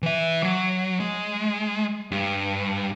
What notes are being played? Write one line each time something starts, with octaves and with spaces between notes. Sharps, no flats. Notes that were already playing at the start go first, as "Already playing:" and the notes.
E3 E5
F#3
G#3
G2